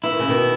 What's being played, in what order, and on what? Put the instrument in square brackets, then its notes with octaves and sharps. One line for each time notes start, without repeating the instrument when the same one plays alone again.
[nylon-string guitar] E3 [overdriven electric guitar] E4
[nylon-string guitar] D#3
C#3
B2 D#3